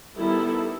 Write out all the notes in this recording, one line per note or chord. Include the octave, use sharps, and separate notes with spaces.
D#3 G3 B3 E4 A4